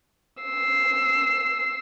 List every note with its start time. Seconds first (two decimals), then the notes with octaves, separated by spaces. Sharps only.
0.43 E6 C7